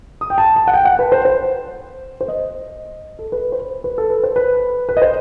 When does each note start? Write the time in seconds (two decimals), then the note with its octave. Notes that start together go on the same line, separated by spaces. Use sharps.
0.21 D#6
0.30 G5
0.38 A5
0.56 A5
0.68 F#5
0.74 G5
0.85 F#5
0.99 B4
1.12 C5
1.25 C5
2.21 C5
2.28 D#5
3.19 A4
3.32 B4
3.52 C5
3.59 B4
3.84 B4
3.98 A4
4.10 B4
4.23 C5
4.36 B4
4.89 B4
4.97 D#5
5.02 C5